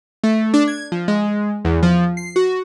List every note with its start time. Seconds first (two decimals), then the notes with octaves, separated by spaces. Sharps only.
0.24 A3
0.54 D4
0.67 G#6
0.92 F3
1.08 G#3
1.65 E2
1.83 F3
2.17 C7
2.36 F#4